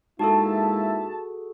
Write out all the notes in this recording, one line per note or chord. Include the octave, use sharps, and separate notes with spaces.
G#2 A#3 E4 F#4 G#4 A4 E5 A5